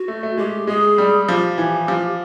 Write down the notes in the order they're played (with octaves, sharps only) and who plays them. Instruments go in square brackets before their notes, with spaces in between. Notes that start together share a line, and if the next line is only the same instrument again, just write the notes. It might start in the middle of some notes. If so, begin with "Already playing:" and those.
Already playing: [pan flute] F#4
[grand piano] A3
A3
[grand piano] G#3 [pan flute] G4
[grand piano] G#3 [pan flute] G#4
[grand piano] G3
[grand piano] F3 [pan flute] G4
[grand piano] E3
F3